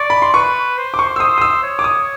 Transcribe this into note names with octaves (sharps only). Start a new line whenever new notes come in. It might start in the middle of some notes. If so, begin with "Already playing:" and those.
Already playing: D5 C#6
B5
C6
B4 C#6
C5
D6
C#6
E6
C5 D#6
D#6
E6
C#5
D6
D#6